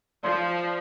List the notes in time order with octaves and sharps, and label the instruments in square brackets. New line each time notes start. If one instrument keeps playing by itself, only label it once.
[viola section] F3 [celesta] D5 C6